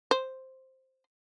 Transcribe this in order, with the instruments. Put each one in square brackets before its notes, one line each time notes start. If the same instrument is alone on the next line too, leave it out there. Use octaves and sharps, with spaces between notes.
[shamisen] C5